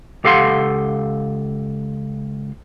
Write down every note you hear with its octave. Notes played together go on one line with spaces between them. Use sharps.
C#2 G4 A4 F5 F#5 C6